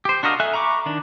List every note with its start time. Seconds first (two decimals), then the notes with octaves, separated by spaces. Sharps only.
0.05 G4 C5
0.23 D4 F#4 A#4 D#5 F5
0.40 A4 E5 G#5 F#6
0.54 A#5 B5 C#6 D6
0.86 D#3 D4